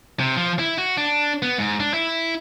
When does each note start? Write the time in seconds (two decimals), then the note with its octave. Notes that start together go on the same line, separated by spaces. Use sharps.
0.20 C3
0.37 F3
0.59 E4
0.78 F#4
0.97 D4
1.42 B3
1.59 G#2
1.80 D4
1.94 E4